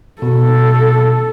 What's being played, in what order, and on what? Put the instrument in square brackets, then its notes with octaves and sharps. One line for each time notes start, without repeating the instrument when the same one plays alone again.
[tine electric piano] B2 [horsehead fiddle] A4